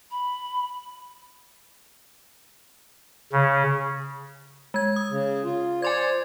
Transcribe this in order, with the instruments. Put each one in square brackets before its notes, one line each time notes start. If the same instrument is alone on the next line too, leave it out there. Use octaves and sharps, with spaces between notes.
[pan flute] B5
[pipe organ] C#3
[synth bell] G#3 G#6
D#6
[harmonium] C#3
F4
[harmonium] C5 D5 [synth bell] G#5 C6 G#6